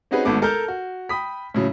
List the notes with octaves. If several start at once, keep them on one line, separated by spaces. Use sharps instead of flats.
C4 C#4 D#4 F#4 G#4 B4
G#1 G#2 A3 B3 D6
A4 A#4 A5 F6 G6
F#4
G5 B5 D#6 B6
A2 C#3 F#3